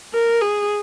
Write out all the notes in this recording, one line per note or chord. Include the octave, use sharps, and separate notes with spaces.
A#4
G#4